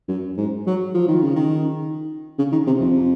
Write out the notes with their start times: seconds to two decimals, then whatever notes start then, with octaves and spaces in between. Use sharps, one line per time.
0.08 F#2
0.37 G#2
0.67 F#3
0.94 F3
1.08 D#3
1.22 C#3
1.36 D#3
2.39 C#3
2.52 D#3
2.67 C3
2.80 F2